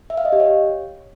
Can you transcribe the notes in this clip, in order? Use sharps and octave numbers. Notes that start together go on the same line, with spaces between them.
E5
F5
D#5
G4
C#5